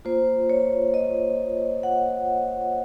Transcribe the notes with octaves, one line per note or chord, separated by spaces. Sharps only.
A#3 F4 C5
C#5
D#5
F#5